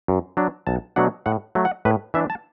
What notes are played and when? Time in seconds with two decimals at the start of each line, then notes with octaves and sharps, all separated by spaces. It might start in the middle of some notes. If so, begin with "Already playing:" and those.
0.08 F#2
0.37 F#3 D4
0.67 B1 A5
0.96 B2 F#3 A3 D4 F#5
1.26 A2 F#5
1.55 F#3 A3
1.65 F#5
1.85 A2 B4
2.14 E3 D4 E5
2.30 A5